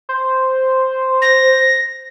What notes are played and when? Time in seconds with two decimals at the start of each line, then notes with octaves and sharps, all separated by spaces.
0.09 C5
1.21 A#6